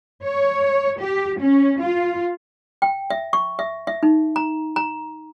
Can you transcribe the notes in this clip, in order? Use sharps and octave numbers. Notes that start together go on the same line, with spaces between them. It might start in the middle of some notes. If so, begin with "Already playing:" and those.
C#5
G4
C#4
F4
G5
E5
C#6
E5
E5
D#4
A#5
A#5